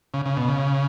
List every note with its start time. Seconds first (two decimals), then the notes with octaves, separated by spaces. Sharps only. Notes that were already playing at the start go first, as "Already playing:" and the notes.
0.14 C#3
0.26 C#3
0.37 B2
0.48 C#3